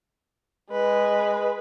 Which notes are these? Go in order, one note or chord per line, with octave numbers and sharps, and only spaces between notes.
G#3 B4